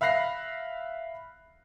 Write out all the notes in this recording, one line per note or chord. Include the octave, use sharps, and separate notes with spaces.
E5 F5 B5 F#6 A#6 C7